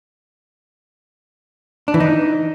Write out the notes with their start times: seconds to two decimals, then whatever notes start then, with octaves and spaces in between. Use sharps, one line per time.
1.88 D4
1.94 E3
2.00 D#4